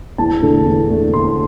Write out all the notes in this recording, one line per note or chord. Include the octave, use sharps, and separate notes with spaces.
E2 A5
D3 A3 D4
E2
D3 A3 D4
E2 C6